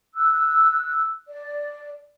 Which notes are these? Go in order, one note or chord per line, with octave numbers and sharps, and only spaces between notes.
E6 F#6
D5